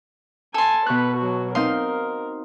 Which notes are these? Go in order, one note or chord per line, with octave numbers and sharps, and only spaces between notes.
A4 G#5 A5 C6
B2 B4 C#6 F#6
F#3 F#4
C4 D#4 A#4 F5 C6